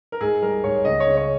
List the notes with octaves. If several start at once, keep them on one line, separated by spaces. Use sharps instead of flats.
A#4
G#2 G#4
G3 A#4
G#2 C#5
C#2 D#5
C#5
C#3
C#5